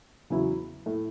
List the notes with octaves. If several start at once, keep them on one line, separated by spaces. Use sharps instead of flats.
E2 C#3 F#3 B3 E4
A2 A3 E4 A4